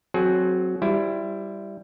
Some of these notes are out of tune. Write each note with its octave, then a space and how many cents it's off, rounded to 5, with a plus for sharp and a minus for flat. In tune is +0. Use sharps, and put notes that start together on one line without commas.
F#3 +0 C4 +15 G#4 +35
G3 +0 E4 +15 C5 +0